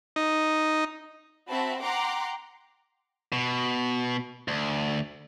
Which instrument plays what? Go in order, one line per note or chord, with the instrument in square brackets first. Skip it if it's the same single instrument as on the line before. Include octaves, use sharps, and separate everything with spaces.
[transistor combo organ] D#4
[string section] C4 F#4 E5 A5 B5
F#5 G5 A#5 C6 D6
[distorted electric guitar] B2
D2